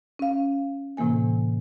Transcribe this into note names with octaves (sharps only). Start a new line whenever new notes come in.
C#4 F5
A2 C3 E3 A#3 G#5